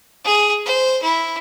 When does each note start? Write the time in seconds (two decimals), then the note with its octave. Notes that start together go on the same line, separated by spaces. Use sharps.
0.25 G#4
0.66 C5
1.03 E4